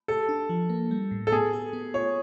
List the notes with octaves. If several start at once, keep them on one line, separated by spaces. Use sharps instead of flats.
G4 A4
D4
F3
A#3
G3
A2
A4
B3 G#4
G4
B3
F4 C#5